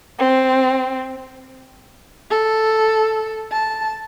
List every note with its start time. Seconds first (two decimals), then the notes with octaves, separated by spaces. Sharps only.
0.18 C4
2.30 A4
3.52 A5